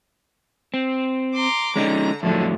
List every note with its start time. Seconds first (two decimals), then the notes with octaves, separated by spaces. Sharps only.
0.74 C4
1.36 A#5 C6 D6
1.76 D3 G#3 C#4 D#4 A#5
2.23 F2 A2 D3 F3 F#3 A3